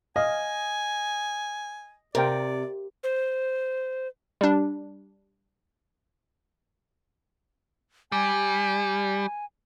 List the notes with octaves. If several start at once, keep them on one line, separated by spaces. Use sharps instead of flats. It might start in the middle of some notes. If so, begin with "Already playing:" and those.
D#5 F5 G#5
C3 A#4 C5 D5 G5
C5
G3 D4
G3 G#5